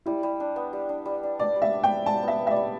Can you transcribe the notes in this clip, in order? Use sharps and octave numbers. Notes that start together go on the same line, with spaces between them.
G3 E4
G3
D4
B3
G3
D4
G3
D4
D4 D5
G3
E5
D4
G5
B3
G3 A5
B3
E5
B3
E5
D5
G3